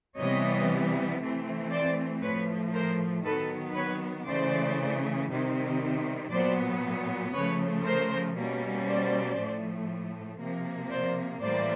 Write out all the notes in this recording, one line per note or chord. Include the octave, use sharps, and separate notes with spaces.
C3 E3 G3 B3 C#5 D#5
E3 A3 C4
C5 D5
A2 F3 A3 B4 C#5
A#4 C5
D#3 F#3 B3 A4 B4
B4 C#5
C#3 E3 A3 C5 D5
C3 D#3 G3 C4
A#2 F#3 B3 C5 D5
C#3 F3 A3 B4 C#5
A#4 C5
B2 G3 A#3 C#4
C5 D5
A2 F3 A3
C3 F3 A#3
C5 D5
A2 E3 G3 A#3 C5 D5